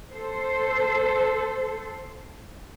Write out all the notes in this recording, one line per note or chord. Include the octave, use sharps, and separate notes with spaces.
A4 C5